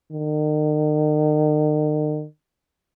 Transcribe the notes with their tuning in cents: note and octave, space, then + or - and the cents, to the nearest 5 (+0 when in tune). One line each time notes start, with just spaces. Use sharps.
D#3 -40